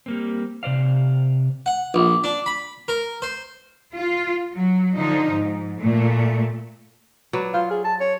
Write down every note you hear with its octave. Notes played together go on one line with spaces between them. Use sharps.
G3 A#3 C4
C3 C5 D5 F5
F#5
A#1
D4
B5
A#4
C5
F4
F#3
D3 F3 D#4
G#2
A#2 A3
F#3 B4 D5
F4 C5
G#4
A5
C#5